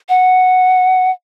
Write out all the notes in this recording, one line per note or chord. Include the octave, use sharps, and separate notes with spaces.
F#5